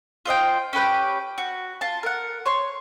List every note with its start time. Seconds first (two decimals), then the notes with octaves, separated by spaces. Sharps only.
0.25 F4 C5 D#5 G5
0.73 C#4 G4 B4 G5
1.38 F#4
1.81 F4 A5
2.03 A#4 F#5
2.46 C#5 C6